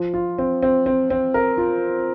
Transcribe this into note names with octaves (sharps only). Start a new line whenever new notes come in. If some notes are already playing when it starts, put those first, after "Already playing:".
Already playing: F3
F4
C4
C4
C4
C4
A#4
F4